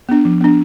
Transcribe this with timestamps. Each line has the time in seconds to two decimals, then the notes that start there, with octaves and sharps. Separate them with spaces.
0.09 B3 D4
0.25 F3
0.41 B3 D4